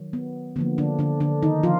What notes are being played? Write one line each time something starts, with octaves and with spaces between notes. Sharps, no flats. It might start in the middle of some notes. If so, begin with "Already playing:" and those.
Already playing: D#3 F#3
B3
D3 F3 A#3 B3
D3 D4
D3 D4
D3 D4
D#3 D#4
F3 F4